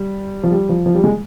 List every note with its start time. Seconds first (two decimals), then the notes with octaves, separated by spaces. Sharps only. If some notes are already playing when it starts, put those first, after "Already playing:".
Already playing: G3
0.43 F3
0.52 G3
0.69 F3
0.86 F3
0.95 G3
1.04 G#3